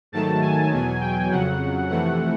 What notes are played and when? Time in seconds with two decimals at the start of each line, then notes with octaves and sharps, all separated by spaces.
0.12 G#2 D#3 F#3 A3 A5
0.42 G#5
0.71 E2 B2 F#3
1.01 G5
1.30 F2 C#3 F#3 F#5
1.89 F2 C3 E3 A3 F#5